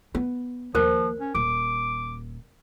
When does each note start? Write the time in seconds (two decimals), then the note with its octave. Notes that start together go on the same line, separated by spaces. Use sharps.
0.15 B3
0.75 D#2 F3 A#4 C5
1.20 C#4
1.35 D#1 D6